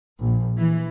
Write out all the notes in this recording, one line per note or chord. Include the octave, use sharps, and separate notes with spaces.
A#1
E3